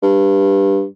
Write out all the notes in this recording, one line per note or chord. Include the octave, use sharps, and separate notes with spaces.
G2